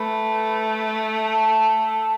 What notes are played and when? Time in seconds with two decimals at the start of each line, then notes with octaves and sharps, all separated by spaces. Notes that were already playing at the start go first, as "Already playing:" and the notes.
Already playing: A3 B4
1.24 A4